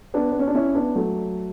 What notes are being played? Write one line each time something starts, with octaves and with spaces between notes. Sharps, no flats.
B3 D4
B3
C#4
D4
C#4 E4
B3 D4
F#3 A3